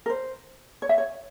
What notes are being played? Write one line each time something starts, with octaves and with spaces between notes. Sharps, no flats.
A#4
C5
C#5
E5
C#5